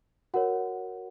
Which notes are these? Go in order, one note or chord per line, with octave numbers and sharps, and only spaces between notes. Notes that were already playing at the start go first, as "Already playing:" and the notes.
F#4 A#4 C#5 F#5